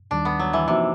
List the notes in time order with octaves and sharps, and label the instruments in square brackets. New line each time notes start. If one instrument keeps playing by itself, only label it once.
[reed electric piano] D#2 D#3 G3 [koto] D4
[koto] B3
F#3
E3
[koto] C3 [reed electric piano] F3 A#3 D#4 F#4